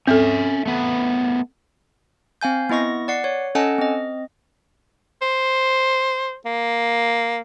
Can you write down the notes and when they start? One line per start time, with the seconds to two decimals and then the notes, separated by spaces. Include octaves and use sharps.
0.07 C4 C#4 A4 E5
0.66 A3 B3
2.41 C4 F5 G#5 G6
2.69 B3 E4 D#5 C#6 A#6
3.08 D5 F#5 C7
3.24 C#5
3.55 C#4 A4 D#5 F#5 G#5 A5
3.78 C4 D#5
5.22 C5
6.45 A#3